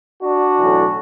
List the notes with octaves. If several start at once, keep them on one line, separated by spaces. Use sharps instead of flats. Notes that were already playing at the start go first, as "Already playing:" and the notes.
D4 F#4
B1 A2 E3